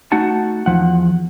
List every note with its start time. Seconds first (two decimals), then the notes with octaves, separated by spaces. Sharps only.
0.12 A3 D#4 F#4 F#5 A5
0.66 E2 F3 F#5